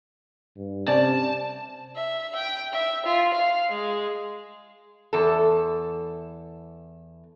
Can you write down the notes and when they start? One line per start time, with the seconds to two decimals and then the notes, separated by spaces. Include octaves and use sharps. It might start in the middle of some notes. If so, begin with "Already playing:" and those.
0.57 G2
0.87 C3 C#4 C5 D5 A5
1.96 E5
2.35 G5
2.72 E5
3.05 F4
3.33 F5
3.70 G#3
5.13 E2 A4